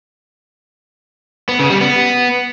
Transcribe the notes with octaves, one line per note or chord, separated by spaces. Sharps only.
B3
C#3
G3
B3